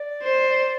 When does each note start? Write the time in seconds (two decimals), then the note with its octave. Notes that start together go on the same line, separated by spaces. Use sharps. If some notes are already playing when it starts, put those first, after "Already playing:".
Already playing: D5
0.23 C5